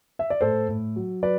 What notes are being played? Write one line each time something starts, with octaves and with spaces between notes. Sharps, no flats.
E5
D5
A2 A4 C5
A2
F#3
F#3 B4 D5